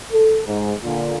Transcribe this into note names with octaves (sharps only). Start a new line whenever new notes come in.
A4
G#2
A#2 D3